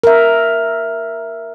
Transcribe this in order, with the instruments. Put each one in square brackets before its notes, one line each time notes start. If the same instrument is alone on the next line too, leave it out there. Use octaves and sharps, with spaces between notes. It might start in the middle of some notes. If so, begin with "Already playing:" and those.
[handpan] A#4 E5